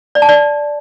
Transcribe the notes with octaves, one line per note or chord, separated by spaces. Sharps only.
D5
A5
D5